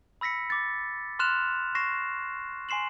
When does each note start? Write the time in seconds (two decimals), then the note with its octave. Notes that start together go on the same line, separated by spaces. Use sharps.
0.21 B5 E6 A#6 B6 C#7
0.50 D6 A6
1.19 C6 F6 F#6 E7 F7
1.75 C#6 A#6 C7 E7
2.69 G#5 C6 C7 E7 F#7